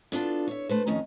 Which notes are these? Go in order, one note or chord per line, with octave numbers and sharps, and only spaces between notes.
B3 D4 F4 A4
C#5 E5
A3 B4 C5
F2 D#3 C#4 D#5